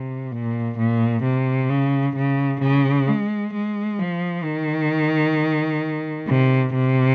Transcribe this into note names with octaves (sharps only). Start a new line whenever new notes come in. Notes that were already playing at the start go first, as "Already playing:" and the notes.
Already playing: C3
A#2
A#2
C3
C#3
C#3
C#3
G#3
G#3
F3
D#3
C3
C3